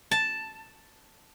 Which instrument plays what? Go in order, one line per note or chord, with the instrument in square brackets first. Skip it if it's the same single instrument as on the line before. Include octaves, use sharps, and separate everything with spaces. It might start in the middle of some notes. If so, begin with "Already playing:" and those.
[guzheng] A5